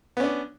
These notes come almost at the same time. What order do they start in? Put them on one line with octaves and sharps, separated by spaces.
B3 C#4 D4